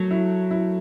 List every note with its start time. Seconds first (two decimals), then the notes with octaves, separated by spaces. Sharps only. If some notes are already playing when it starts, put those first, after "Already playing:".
Already playing: F#3 A3
0.11 E4
0.51 E4